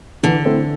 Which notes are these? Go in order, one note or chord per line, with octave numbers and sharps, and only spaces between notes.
D3 E3
A3 C4 E4 A4